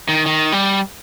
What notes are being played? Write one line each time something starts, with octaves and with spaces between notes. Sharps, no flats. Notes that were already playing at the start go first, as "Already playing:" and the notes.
D#3
D#3
G3